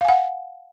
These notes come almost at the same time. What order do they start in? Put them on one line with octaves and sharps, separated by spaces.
F5 G#5 F#5